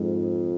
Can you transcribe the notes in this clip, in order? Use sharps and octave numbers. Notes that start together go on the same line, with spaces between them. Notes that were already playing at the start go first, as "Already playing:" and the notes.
Already playing: F2 G#2